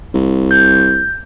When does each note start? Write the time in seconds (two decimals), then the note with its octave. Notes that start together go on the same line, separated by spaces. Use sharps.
0.14 C2
0.51 G6